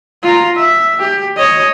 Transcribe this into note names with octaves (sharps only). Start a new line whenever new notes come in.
F4 A#5
E5
G4
C#5 D#5